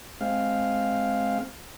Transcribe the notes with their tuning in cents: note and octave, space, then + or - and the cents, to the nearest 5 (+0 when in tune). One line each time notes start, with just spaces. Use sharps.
G#3 +15 C4 +0 F5 +0